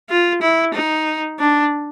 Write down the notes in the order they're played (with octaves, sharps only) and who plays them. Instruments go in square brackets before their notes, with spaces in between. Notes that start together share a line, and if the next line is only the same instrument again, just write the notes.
[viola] F4
E4
D#4
D4